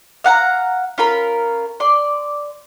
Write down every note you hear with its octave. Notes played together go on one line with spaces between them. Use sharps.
F5 F#5 A5 A#5
C#4 F4 A#4 B5
D5 C6